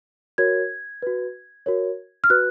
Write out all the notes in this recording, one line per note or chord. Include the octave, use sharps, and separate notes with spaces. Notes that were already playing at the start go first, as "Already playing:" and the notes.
F#4 A#4 C#5 G#6
F#4 B4
F#4 A#4 C#5
F6
F#4 B4 F#6